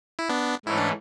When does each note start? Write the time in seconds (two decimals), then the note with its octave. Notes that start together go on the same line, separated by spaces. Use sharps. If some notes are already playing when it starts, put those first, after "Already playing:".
0.19 E4
0.29 B3 D4
0.66 G#2 E3 A3 C#4 E4
0.77 D4